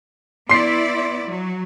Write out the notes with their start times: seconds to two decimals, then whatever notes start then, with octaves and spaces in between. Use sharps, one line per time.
0.49 B3 E4 D5 C6 C7
1.27 F#3